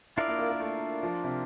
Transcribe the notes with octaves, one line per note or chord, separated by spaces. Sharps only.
D4 E4 F4 A#4 D5 F5
A#3
A#3
A#3
A3
F3
C3